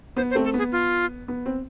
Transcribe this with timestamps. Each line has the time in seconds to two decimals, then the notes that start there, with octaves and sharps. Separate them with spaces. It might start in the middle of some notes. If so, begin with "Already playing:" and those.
0.17 B3 C5
0.30 C5
0.35 A3 C4
0.45 A4
0.54 B3 G#4
0.72 F4
1.28 B3
1.46 C4